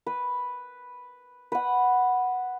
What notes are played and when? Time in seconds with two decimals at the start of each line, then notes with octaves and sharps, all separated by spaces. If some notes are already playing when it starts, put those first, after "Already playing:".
0.06 B4
1.52 B4 F#5